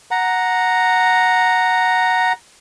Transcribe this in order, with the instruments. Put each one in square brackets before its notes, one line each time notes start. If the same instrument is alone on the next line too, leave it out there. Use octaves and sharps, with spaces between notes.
[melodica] F#5 A#5